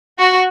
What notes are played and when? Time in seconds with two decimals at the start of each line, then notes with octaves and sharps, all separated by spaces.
0.18 F#4